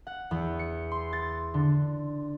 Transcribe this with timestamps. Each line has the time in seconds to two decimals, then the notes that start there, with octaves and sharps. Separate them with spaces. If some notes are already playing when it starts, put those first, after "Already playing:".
0.07 F#5
0.31 E2
0.59 C#7
0.91 C6
1.13 A6
1.54 D3